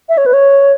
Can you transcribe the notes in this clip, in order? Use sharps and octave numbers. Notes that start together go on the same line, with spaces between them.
E5
C#5
B4
C#5